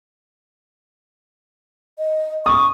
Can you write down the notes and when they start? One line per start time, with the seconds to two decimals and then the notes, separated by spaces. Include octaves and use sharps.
1.98 D#5
2.46 C#6 D#6